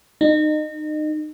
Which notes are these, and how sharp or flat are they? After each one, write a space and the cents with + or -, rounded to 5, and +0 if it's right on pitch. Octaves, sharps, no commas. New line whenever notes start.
D#4 -30